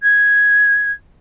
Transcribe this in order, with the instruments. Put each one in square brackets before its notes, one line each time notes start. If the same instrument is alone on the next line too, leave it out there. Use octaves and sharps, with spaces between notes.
[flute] G#6